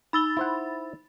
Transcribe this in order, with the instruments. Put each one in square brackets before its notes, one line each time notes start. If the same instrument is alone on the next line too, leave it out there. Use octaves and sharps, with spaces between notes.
[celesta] D#4 E6 G7 [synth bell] B5 A6
[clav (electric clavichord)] E4 C5 F#5